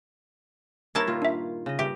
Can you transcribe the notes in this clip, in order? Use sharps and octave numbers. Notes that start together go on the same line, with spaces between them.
G2 A#3 D#4 E4 C#5 A5
A#2 D#3 F4
D4 E5
C#3 D#5
G2 G4 E5